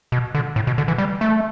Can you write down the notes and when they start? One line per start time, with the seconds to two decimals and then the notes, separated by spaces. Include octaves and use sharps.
0.12 B2
0.35 D3
0.56 A2
0.67 B2
0.78 D3
0.88 E3
0.98 G3
1.21 A3